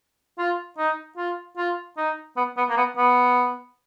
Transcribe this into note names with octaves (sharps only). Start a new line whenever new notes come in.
F4
D#4
F4
F4
D#4
B3
B3
A#3
B3
B3